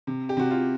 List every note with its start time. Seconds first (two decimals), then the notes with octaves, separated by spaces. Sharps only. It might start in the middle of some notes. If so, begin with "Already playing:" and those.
0.07 C3
0.29 G4
0.37 C3 F#4
0.51 F4